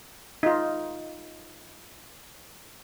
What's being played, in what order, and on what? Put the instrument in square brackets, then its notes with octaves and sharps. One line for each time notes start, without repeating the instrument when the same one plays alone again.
[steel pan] D#4 F4